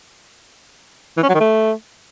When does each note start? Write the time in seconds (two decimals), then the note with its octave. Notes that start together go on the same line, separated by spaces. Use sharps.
1.17 E3
1.23 C#4
1.29 F#3
1.34 D#3
1.40 A3